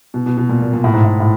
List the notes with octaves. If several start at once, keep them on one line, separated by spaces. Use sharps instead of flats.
B2
B2
B2
A#2
A#2
A#2
A2
G#2
A2
A2